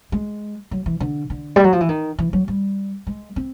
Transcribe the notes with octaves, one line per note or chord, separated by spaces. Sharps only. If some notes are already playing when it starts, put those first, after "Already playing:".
G#3
F#3
E3
D3
D3
G3
F#3
F3
E3
D#3
E3
F#3
G3
G#3
C4